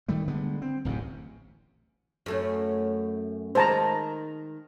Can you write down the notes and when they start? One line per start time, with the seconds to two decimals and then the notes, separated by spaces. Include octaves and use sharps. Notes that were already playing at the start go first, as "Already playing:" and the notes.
0.08 D#3 G3 A3
0.28 D3 G3 G#3 B3
0.62 C4
0.85 D1 A1 F#2 C3
2.26 F#2 A3 C#4
3.55 D#3 G#3 C5 A5 A#5